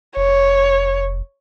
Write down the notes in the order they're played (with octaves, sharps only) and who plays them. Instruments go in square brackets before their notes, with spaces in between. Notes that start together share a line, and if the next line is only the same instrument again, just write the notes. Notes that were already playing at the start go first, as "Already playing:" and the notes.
[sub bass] F1 [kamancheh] C#5